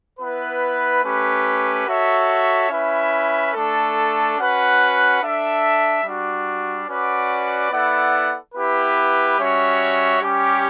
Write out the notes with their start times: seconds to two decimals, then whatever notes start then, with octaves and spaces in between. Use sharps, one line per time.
0.19 B3 E4 B4
1.04 A3 C#4 G4 B4
1.86 F#4 A4 C#5 E5
2.70 C#4 E4 B4 E5
3.53 A3 D4 A4
4.37 C#4 F#4 B4 F#5
5.21 D4 A4 E5
6.04 G3 D4 F#4
6.87 C#4 F#4 B4 D5 F#5
7.71 B3 E4 A4 D5 F#5
8.54 B3 E4 G4 B4
9.39 G3 C#4 F#4 C#5 E5
10.21 G3 C#4 G4